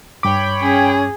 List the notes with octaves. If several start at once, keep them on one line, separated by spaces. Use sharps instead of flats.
G2 C#5 G5 B5 D6
C#4 G#4